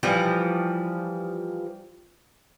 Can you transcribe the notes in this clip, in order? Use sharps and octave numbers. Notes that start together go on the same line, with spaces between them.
E3 F3 G3